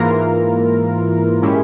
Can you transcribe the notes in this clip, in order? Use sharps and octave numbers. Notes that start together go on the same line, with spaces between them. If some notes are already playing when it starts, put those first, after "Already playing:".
Already playing: G#2 E3 A#3 F4 A#4
A#2 G#3 C#4 E4 G4